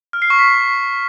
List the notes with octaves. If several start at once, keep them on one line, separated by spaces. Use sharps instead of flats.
F6
C7
C#6
B6